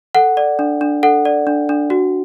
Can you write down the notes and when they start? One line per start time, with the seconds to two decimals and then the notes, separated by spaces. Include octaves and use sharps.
0.15 A4 F#5
0.37 D5
0.59 D4
0.81 D4
1.03 A4 F#5
1.25 D5
1.47 D4
1.69 D4
1.90 F#4